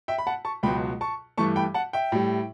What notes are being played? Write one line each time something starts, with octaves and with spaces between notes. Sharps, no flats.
E5 G5
B5
F#5 A5
A5 C#6
C#2 B2 F#3 G5 B5
A5 C#6
G2 E3 A3 A5 C#6
G5 B5
F#5 A5
E5 G5
A2 G3